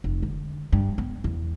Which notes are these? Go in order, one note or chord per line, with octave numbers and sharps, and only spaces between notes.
F1
D3
G2
B3
E2